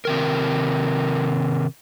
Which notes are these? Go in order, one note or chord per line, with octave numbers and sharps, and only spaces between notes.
C3 D#3 A#4